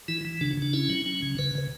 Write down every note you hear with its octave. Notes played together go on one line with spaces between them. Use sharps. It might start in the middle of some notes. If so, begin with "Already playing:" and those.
E3 E4
E3
C#3 D4
C#3 D4
C#4 E4
F#3
C#4
C#3
C#3 B4
C#3